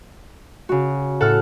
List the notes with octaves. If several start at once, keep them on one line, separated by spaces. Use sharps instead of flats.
C#3 F#4
A2 A4 F#5 F6